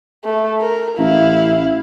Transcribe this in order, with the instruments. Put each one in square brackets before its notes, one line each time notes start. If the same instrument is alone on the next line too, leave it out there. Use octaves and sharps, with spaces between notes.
[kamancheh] A3
A#4
[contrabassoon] A1 [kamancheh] E4 F5